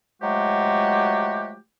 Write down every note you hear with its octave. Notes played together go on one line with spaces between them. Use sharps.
F3 F#3 G#3 A3 F#4 G4